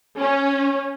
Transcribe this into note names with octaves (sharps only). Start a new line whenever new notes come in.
C#4